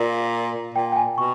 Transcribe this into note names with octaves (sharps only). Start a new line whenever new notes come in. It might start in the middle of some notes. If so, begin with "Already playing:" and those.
Already playing: A#2 F5
A#2 G5
G5
G#5
B2 C#6